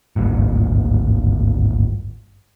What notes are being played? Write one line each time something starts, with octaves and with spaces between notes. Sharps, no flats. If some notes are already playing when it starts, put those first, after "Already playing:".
G#1 D2 G2 A#2